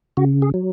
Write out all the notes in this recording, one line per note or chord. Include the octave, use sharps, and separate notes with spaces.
C#3 F#4
G#4
F#3